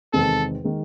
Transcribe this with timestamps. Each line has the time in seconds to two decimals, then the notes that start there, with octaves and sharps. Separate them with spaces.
0.13 E2 C3 D#3 G#3 C4 A4
0.64 D#3 G#3